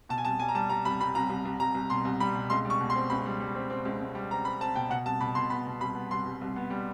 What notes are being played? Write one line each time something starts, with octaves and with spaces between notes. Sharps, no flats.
B2 A5
G#5
C2 A5
G3 G#5
A#5
G3 A5
G3 A#5
C2 B5
C2 B5
C2 A#5
C2
C2
C2 A#5
C2
B2 C6
C2
G3 B5
B2
C#2 C6
G3
C#6
B2
C6
C4
C#2 B5
G3
G3
C4
C4
C#2
C#2
G3
C4 A#5
C4 B5
C4 A5
B2 G5
B2 F#5
C2 A5
B2 B5
B2 C6
B3 B5
B2
C2 B5
B3
C2 C6
C2
C2
B3
G3